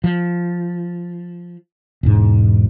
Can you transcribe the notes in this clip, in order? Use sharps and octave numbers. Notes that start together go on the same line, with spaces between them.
F3
E1 G#2